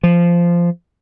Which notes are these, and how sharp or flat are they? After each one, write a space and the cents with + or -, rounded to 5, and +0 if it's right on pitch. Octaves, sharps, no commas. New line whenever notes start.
F3 -15